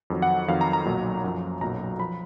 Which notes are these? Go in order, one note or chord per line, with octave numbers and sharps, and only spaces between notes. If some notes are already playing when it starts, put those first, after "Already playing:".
F2 D#3 F#3
F#5
F2 D#3 F#3 F5
A#5
A#5
B1 A#2 F#3
F#2 F3
B1 A#2 F#3 A#5
F3 B5